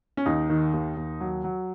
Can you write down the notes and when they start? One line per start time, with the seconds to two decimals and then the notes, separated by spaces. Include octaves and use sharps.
0.17 C#4
0.26 D#2 D#4
0.49 D#3
0.73 D#2
0.97 D#2
1.21 F#3
1.44 F#3